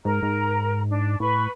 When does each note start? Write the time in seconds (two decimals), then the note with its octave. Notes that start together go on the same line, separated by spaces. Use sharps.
0.05 G#2 A#4 A#5
0.22 G#2
0.89 D4
1.20 A2 B4 B5 C#6